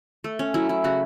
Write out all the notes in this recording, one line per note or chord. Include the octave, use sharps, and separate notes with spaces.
A3
C#4
F#3 E4
E4
C#3 F#4